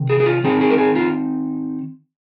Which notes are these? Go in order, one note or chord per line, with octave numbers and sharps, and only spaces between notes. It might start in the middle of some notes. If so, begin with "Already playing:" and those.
Already playing: C3 D#3
G#4
G#4
F4
D#3 C4 D#4 G#4
G#4
A#4
G#4
F4